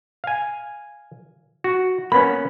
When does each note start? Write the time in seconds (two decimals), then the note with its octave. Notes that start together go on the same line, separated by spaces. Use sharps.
0.24 F5 G#5
1.64 F#4
2.12 A#3 B3 C#4 B5